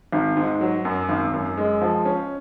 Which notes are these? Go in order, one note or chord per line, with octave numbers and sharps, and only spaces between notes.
G#1
G#2
F#3
F#2
G#1
F#2
G#3
F3
C#4